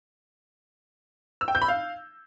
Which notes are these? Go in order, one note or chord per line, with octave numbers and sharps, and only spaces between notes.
E6
G5
G6
B5
F5